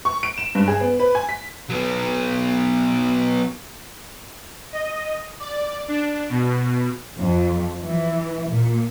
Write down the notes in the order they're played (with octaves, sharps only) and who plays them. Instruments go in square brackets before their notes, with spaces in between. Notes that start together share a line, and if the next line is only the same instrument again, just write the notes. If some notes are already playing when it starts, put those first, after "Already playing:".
[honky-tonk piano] C#6
D7
E7
G2
G#4
B3
B4
G#5
B6
[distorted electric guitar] F#3 B3
[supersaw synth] D#5
D5
D4
B2
[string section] F2
E3
A#2